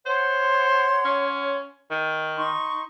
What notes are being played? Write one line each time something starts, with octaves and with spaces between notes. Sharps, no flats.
C5 C#5 F#5 C6
C#4
D#3
D#4 C6 C#6